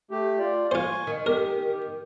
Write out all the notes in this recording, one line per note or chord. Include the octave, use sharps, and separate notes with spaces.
A3 G4
F4 D5
F4 C5 G#5 C#6
D#3
G4 A#4